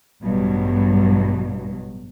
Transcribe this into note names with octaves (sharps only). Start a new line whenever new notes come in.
A1 G2 B2 F#3